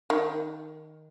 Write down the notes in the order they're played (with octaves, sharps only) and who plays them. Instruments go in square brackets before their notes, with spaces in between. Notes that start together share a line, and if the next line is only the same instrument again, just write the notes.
[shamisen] D#3